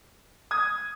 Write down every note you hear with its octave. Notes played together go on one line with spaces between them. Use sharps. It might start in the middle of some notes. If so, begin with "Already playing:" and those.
D#6 G#6